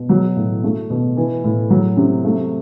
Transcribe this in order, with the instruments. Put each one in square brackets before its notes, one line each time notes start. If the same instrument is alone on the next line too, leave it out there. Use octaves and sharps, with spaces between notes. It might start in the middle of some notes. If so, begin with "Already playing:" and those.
Already playing: [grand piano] B2
F#3
A2
A3
B2
E3
A2
F#3
C3
A3